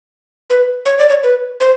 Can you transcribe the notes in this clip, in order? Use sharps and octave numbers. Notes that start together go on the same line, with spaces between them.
B4
C#5
D5
C#5
B4
C5